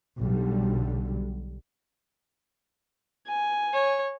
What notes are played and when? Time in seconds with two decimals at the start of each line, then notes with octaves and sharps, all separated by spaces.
0.20 B1 D3 G3
3.26 G#5
3.73 C#5